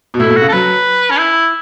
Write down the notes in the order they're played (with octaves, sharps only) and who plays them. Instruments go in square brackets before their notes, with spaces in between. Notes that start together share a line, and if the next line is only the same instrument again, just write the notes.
[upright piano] B2
[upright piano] A2 [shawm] E4
[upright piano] B2
A2
[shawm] F#4
[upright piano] C#3
[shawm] A4
[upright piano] F#3 [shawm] B4
[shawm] C#4
E4